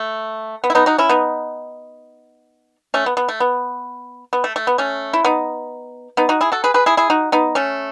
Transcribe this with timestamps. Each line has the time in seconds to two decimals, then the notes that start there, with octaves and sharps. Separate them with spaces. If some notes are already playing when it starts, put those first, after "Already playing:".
Already playing: A3
0.64 B3
0.70 E4
0.75 B3 D#4
0.86 D#4 F#4
0.98 C#4 E4
1.09 B3 D#4
2.94 A3 C#4
3.06 B3
3.17 B3
3.28 A3
3.40 B3
4.33 B3
4.44 A3
4.56 A3
4.67 B3
4.78 A3 C#4
5.13 E4
5.25 B3 D#4
6.17 B3 D#4
6.29 D#4 F#4
6.41 E4 G#4
6.52 F#4 A4
6.64 G#4 B4
6.74 G#4 B4
6.86 E4 G#4
6.97 E4 G#4
7.10 D#4 F#4
7.32 B3 D#4
7.55 A3 C#4